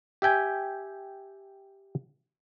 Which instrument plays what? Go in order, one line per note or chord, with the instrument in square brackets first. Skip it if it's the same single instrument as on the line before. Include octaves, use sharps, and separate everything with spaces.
[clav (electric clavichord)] G4 E5 G5 G#5